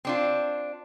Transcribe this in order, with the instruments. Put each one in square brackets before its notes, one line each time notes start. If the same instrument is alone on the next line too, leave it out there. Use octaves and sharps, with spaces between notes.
[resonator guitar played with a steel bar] C4 D4 F4